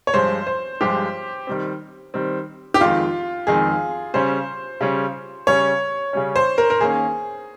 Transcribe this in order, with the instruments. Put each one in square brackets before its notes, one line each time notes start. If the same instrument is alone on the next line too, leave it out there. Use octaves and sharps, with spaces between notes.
[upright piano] C#5
[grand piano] G2 F3 G#3 [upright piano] C5
[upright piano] C5
[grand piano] G2 F3 G#3 [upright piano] G4
[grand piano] D#3 G3 C4
D#3 G3 C4
[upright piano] G4
[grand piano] F2 D#3 G#3 [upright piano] F4
[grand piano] F2 D#3 G#3 [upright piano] G#4
[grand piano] C#3 G3 C#4 [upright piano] C5
[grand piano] C#3 G3 C#4
[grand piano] C#3 G3 C#4 [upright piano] C#5
[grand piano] C#3 G3 C#4
[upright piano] C5
A#4
A#4
[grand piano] D#3 A#3 C#4 [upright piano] G#4